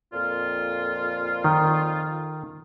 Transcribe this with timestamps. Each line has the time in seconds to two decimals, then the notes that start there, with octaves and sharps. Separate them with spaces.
0.13 F2 A#2 F4
1.44 D#3